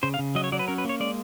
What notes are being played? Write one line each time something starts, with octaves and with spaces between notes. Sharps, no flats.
C#3 C5
F5
C#3
F#3 D#5
C#5
F#3 D5
B4
C#4 A#4
B4
A#3 C#5
G#3 D5